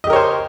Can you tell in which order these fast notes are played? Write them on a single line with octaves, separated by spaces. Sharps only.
D#5 G4 A#4 C#5 C5